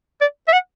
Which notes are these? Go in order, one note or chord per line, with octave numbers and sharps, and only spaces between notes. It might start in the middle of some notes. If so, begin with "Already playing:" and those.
D5
E5
F#5